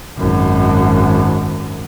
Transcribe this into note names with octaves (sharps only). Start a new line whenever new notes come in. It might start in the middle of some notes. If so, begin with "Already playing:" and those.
G#1 F#2